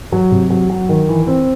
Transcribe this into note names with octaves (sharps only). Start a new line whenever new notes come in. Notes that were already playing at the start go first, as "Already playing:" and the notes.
F#3
C3
F#3
F#3
D#3
E3
C4